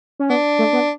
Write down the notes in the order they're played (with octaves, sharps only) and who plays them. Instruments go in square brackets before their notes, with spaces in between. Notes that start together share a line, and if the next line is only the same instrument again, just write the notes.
[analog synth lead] C#4
[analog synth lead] B3 [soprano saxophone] D4
[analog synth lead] A3
B3